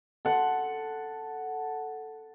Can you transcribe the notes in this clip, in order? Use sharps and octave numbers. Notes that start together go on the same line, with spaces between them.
A4 F#5 C6